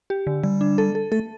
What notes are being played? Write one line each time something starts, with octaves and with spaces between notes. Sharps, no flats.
G4
D3
D3 G3
D4
A4
A4
A3 A4